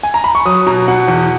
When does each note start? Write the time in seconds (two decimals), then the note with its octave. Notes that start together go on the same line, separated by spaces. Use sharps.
0.03 G#5
0.14 A#5
0.24 B5
0.35 C#6
0.45 F#3 D#6
0.66 B2 A#5
0.88 B2 F#5
1.08 E2